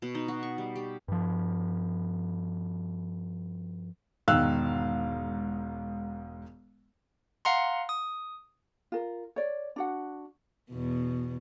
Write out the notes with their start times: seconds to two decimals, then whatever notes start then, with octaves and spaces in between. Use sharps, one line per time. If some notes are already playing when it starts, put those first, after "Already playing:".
0.02 B2
0.15 D#4
0.28 F#4
0.43 C#6
0.58 G3
0.76 G4
1.08 G2 F3
4.28 E1 G#2 D#3 F5 E6 F#6
7.45 F5 F#5 A#5 C6
7.89 D#6
8.92 F4 A#4
9.36 C#5 D5
9.76 D4 F#4 F#5
10.70 E2 B2